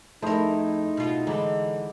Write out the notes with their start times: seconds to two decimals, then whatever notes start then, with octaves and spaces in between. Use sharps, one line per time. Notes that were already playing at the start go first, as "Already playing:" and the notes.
0.22 F2 A3 D#4 E4 G#4 A#4 C5
0.97 B2 F4
1.27 D3 E3 G#3 D#4 D5 E6